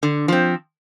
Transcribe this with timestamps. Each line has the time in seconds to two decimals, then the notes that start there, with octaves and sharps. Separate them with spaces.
0.03 D3
0.28 F3 C4